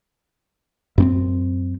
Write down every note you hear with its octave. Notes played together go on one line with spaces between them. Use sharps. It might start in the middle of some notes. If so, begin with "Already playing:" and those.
F#2 B3 C4